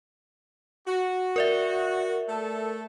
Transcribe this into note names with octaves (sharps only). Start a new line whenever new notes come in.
F#4
A#4 D5 E5
A3 A4